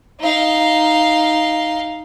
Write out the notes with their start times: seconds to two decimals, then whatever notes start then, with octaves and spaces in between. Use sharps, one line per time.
0.20 D#4 F5